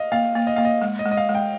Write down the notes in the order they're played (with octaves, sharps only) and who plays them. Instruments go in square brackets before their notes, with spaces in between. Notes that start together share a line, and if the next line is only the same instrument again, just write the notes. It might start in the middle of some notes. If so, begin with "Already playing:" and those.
Already playing: [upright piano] D#5 F5
[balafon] A#3 [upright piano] F5
[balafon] A#3
[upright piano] D#5
[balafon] A#3 [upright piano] F5
[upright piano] D#5
[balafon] G#3
[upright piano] D#5
[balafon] G#3
[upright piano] D#5
F5
[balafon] G#3
[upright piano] G5